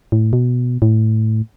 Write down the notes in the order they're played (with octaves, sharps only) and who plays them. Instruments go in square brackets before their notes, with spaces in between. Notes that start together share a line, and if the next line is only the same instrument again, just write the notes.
[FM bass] A2
B2
A2